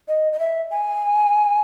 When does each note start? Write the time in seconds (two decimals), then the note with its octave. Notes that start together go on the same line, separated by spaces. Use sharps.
0.08 D#5
0.33 D#5
0.40 E5
0.71 G#5